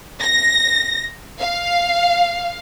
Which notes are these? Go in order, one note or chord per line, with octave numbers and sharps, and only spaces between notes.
A#6
F5